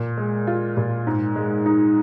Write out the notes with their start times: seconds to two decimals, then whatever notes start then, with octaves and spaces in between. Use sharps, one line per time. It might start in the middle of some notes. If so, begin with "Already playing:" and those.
Already playing: A#2
0.17 G#3
0.47 F4
0.77 A#2
1.07 G#2
1.36 G#3
1.66 D#4